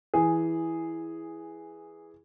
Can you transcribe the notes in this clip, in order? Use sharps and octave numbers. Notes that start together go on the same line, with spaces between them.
E3 G#4